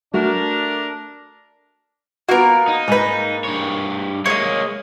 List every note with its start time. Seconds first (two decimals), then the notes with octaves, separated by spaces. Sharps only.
0.13 A3 D4 F#4 A#4
2.29 A#3 B3 F#4 A#4
2.68 D#4
2.88 G#2 B4
3.44 G2 C#5
4.26 G#3 A#3 C#5 D#5